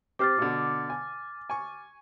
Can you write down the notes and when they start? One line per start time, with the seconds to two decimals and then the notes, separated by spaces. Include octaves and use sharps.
0.19 C4 G4 C5 D6 F6 A6
0.38 B2 D3
0.90 G#5
1.50 G#5 C#6